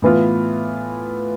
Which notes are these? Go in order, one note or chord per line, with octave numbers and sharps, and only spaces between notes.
A2 E3 B3 F4